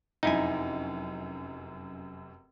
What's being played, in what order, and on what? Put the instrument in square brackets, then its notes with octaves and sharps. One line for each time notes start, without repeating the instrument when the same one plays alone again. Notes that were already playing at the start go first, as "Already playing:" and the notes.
[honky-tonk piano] F1 F#2 [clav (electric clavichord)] D#4 E4 G#5